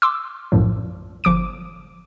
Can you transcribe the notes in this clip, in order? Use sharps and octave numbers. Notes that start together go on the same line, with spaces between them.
C6 D6 E6
B1 F#2 A2 F3
G1 F3 D6 D7